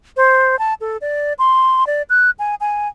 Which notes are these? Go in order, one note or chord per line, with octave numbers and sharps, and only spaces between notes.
C5
A5
A4
D5
C6
D5
F#6
G#5
G#5